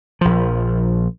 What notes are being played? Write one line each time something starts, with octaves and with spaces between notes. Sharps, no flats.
A#1 F3